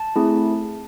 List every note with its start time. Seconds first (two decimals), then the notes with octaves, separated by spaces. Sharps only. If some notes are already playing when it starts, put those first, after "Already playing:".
Already playing: A5
0.16 A3 C4 E4 G#4